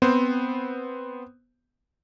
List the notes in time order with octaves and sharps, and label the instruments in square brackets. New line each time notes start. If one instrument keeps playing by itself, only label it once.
[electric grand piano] B3 C4 C5